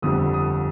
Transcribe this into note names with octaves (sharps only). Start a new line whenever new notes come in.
G1 F2 D3 G3 D#6
D#6